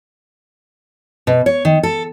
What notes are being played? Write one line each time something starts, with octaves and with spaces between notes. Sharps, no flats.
B2
C#5
D#3
A4